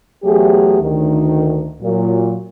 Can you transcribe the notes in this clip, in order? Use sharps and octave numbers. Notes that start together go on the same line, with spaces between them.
E2 F#3 A3 G4 G#4
D2 D#3
A#2 F#3